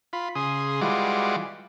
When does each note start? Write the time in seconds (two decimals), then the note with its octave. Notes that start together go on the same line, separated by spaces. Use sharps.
0.13 F4 B5
0.35 C#3 G#4 C6 D#6
0.81 E3 G3 G#3 F4 F#4 D6